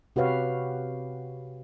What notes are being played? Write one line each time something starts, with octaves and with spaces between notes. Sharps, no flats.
C3 F#4 G4 B4 C#5 F5